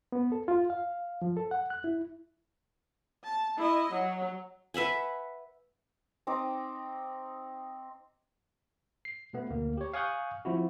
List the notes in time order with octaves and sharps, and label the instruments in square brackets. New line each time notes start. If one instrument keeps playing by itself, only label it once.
[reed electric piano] B3
A4
F4
F5
F3
A4
F#5
F#6
E4
[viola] A5
E4 D#5
F#3
[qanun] B4 E5 F#5 G#5
[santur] C4 D#4 D6 D#6
[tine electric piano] C7
B2 A3 B3
D2 A#3
G4 C#5
F5 G#5 C#6 D#6 F#6 G6
F3 C4 E4 F#4